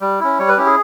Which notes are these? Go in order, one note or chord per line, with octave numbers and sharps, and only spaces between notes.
G3
C#4 E4
G3 C#5
B4
C#4 E4 G4
G#4